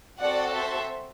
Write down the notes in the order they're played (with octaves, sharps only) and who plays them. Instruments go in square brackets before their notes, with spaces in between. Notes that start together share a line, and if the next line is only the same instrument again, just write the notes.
[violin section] C4 F#4 A4 D5 F#5
C5 E5